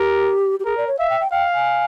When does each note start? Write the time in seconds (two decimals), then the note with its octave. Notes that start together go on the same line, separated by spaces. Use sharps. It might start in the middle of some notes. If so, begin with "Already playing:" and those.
Already playing: G4 A#4
0.60 G4
0.65 G#4 A#4
0.77 D5
0.87 C#5
0.99 E5 F5
1.10 G5
1.20 G5
1.32 F5 G5
1.54 G#5